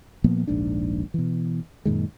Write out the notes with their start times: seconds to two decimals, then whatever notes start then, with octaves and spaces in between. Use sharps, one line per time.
0.24 A#2 F3 A#3 B3
0.47 D#1 A#1 G#2 D4
1.14 B2 E3
1.85 F#2 A#2 D#3 G#3